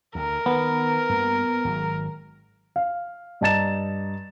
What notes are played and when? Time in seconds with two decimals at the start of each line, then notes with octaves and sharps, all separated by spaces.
0.15 D2 A#4
0.46 D#3 B3
1.09 G2 A#3
1.65 G#1 F#3
2.76 F5
3.41 G2 D#5 A5 A#5 A6 E7